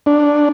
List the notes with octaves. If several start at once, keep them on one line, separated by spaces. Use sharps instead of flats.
D4